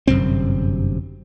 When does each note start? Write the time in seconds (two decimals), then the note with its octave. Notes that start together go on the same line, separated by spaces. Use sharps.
0.07 G1 F#2 C3 C4